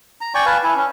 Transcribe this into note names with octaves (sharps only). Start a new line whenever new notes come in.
A#5
D5 G5 G#5 C#6
B4 F5 G#5 A5
E4 G#5
C#4